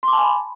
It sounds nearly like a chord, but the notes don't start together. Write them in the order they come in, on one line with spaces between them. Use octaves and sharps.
C6 D6 A5 G#5 B5